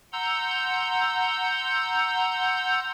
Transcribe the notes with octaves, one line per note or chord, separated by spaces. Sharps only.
F#5 A#5 C6 E6 G6